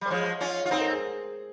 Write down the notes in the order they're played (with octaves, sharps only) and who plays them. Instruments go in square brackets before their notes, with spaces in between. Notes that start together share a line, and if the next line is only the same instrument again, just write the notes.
[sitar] G3
[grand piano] C5
[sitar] F3 G#3 [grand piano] C#5
[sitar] C#4 F4
F4
[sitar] C4 D#4 [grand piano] C5
[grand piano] A#4
G#4